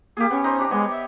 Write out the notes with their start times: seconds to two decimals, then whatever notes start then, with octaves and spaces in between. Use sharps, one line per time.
0.17 A#3 G4 G#4
0.30 B3 C#4
0.44 D#4 C5 G#5
0.59 D4 G4
0.71 G#3 B3 C#5 D#5
0.90 E5